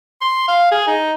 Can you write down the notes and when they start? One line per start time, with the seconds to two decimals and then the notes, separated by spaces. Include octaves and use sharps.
0.21 C6
0.48 F5
0.72 G#4
0.87 D#4